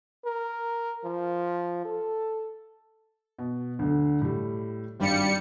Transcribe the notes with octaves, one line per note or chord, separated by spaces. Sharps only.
A#4
F3
A4
B2
D2 D3
A2 G3
G#1 G2 G3 F5 C#7